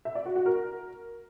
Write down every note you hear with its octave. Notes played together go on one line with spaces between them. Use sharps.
E5
D5
F#4
F#4
A#4